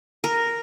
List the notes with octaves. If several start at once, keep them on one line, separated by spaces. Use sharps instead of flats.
A#4